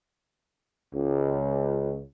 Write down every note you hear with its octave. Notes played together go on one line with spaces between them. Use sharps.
C#2